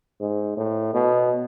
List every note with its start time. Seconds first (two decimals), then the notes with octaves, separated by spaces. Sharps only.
0.20 G#2
0.57 A2
0.94 B2